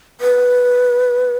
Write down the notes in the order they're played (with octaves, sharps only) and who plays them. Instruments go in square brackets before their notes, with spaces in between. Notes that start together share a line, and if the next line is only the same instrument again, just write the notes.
[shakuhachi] B4